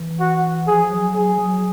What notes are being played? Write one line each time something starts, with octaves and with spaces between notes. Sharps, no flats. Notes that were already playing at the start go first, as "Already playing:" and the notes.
Already playing: E3
F#4
F3 G#4
F#3
F#3 G#4
F#3